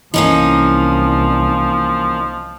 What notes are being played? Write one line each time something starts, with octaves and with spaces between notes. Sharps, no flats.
C2 E3 F3 A#3 C#4 D#4